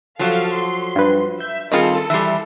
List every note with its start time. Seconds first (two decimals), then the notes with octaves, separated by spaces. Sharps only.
0.19 F3 F#3 A4 F5
0.53 C6
0.95 G2 B4
1.40 E5 G6
1.72 D#3 G3 C4 F4 G#4 A4 C#7
2.10 E3 G3 E5 C6